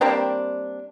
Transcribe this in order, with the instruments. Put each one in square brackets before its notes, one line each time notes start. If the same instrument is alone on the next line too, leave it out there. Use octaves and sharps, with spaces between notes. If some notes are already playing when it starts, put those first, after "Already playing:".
[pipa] G3 A#3 C4 D4